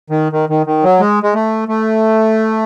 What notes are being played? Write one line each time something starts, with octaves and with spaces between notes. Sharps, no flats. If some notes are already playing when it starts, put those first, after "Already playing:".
D#3
D#3
D#3
D#3
F#3
G#3
G#3
A3
A3